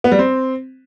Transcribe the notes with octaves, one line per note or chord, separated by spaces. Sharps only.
B3
G3
C4